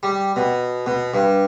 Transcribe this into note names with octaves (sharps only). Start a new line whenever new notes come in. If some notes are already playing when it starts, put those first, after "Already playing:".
G3
B2
B2
G2